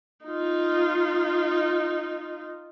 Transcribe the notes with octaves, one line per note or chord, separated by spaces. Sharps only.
D#4 F4